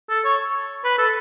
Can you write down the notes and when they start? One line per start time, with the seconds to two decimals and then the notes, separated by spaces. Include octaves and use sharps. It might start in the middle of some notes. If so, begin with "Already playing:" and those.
0.09 A4
0.25 C#5
0.84 B4
0.98 A4